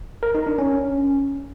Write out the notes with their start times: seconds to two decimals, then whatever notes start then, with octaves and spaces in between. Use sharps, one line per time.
0.23 A#4
0.35 D#4
0.47 D4
0.59 C#4